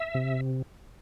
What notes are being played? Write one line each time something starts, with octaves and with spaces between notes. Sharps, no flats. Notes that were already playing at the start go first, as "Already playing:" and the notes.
Already playing: E5
C3